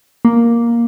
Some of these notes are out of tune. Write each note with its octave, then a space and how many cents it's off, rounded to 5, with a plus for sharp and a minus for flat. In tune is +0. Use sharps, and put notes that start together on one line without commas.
A#3 +5